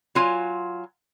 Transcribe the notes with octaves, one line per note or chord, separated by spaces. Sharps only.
F#3 F4 G#5